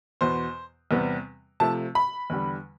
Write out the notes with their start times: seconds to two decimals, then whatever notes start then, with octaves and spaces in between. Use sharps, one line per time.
0.21 E2 B2 B3 C5
0.91 E2 C3 G3 B3
1.60 C3 F3 A3 A5
1.95 B5
2.30 E2 D3 G3